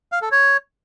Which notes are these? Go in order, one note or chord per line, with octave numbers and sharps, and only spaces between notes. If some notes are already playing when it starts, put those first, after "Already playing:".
F5
A4
C#5